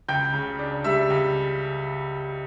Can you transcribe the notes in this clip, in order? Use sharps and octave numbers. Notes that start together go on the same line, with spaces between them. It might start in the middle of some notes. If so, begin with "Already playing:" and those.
C#2 G5 G6
C#3
D4
G3 E5 E6
C#2